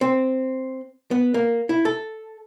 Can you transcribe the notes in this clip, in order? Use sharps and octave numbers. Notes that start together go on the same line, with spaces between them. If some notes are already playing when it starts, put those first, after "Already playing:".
C4
B3
A#3
E4
A4